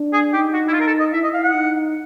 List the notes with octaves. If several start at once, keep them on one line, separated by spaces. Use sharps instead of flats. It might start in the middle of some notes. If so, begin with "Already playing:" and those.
Already playing: D4
G#4
D#4 G4
F#4
E4
F4
A#4
A4
D#5
E4 E5
D#5
F5
F#5
D#4